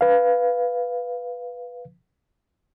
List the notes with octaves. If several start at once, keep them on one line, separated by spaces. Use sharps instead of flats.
B4 F5